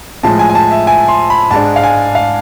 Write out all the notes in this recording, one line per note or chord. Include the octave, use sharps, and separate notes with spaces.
A2 F3 G#3 A5
G#5
G#5
A5
E5
G#5
C6
B5
G#2 G#3 D4 A5
F5
G#5
F5